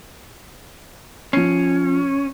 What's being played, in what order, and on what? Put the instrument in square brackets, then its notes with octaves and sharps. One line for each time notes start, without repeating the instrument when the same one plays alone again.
[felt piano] F3 C7 [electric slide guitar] C#4